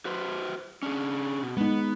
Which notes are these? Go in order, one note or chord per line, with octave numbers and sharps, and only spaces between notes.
F#4 B4 C5
C#4 D4 G#4
B2
G#3 B3 D#4